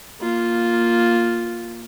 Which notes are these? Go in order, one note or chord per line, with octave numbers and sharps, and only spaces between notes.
A#3 F4